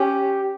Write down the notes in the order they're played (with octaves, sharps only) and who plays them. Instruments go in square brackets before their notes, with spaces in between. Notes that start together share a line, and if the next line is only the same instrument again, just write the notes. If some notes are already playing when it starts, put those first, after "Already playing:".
Already playing: [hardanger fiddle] C#4 [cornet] G4